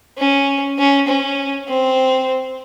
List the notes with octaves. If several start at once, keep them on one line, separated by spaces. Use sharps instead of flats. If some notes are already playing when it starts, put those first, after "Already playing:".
C#4
C#4
C#4
C4